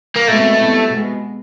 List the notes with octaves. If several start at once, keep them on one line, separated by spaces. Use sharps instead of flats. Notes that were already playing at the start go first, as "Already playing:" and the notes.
A#3
B2 G#3 A3 C4
B2 G3 C4 E4
B2 G#3 B3